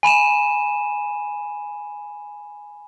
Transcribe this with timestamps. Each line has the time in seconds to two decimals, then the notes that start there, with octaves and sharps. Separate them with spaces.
0.03 G#5 B5 D#7 E7